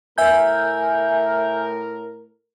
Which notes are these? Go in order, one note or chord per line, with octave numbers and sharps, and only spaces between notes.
A2 A#4 E5 G#5 G6